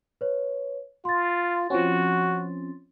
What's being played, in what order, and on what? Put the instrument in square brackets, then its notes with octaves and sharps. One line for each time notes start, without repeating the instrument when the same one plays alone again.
[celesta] B4 C#5
[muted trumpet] F4 [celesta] C6 A6
[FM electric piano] F3 C4 C#4 [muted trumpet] F#4